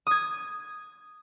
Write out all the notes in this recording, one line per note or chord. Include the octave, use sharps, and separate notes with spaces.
D#6 G#6